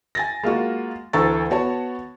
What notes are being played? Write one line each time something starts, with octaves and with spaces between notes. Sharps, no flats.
G#5 A6 A#6
G#3 A#3 F4 F#4
D2 E3 A4 A#5 C#6 A6
B3 F#4 C#5 A5